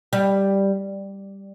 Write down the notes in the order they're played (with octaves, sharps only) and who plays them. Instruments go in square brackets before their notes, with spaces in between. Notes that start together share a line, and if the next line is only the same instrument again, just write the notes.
[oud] G3